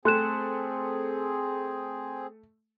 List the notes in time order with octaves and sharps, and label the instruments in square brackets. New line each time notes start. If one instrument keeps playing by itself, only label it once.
[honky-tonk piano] A3 [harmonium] C4 G#4 [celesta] C6 F#6 E7